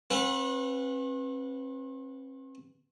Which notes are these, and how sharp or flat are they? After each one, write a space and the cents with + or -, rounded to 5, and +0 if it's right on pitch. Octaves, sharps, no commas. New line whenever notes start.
C4 +45 B4 +0 F#5 -25